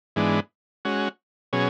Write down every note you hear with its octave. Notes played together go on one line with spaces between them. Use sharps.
G#2 E3 G#3 B3 D4
G#3 C#4 F#4
B2 F#3 C#4 G#4